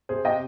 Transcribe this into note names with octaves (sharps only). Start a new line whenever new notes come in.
C3 G#4 C5
C3 D#5 G5